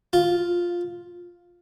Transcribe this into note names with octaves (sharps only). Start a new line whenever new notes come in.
F4